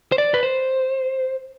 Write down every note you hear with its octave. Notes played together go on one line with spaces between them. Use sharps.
C5
D5
B4
C5